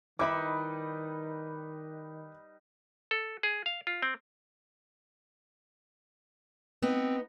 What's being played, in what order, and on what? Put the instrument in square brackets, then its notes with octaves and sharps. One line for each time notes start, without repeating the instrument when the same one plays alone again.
[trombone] D#3 [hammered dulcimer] G3 D#4 B4 [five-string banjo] E4 E5 B5 [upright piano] D6
[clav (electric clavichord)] A4
G#4
F5
F4
C4
[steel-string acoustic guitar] B3 D#4 [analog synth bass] C4